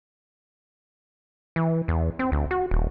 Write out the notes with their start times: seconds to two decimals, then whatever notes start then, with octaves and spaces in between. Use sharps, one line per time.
1.56 E3
1.88 E2
2.19 C4
2.32 D2
2.51 F#4
2.71 D#1